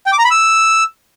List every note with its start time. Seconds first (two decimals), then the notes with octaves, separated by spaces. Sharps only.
0.06 G5
0.12 D6
0.19 A#5
0.25 B5
0.31 E6